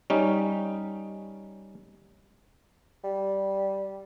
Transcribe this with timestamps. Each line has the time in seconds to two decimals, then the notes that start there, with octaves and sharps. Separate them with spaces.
0.10 G3 C#4 D#4
3.04 G3